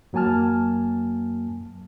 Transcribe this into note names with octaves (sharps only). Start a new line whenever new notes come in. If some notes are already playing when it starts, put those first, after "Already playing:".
F#2 F#3 A#3 G#5 A5 F6